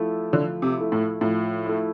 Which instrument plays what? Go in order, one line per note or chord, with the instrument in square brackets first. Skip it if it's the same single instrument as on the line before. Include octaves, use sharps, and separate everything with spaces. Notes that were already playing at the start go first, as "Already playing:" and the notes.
Already playing: [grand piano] F3 A3 E4
[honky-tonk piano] D3 [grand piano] F3
[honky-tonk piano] C3
[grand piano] A3 E4
[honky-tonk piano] A2
[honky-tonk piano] A2 [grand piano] F3
[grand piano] A3 E4